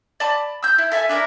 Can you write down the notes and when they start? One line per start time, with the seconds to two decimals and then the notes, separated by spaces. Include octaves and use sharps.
0.20 D5 A5 B5
0.63 E6 G6
0.78 E4
0.92 A4 E5 G#5 A5
1.09 D4 E4 A#4 A#5